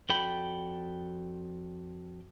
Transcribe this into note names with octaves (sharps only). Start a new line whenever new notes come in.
F2 F#4 A4 D5 G5 B5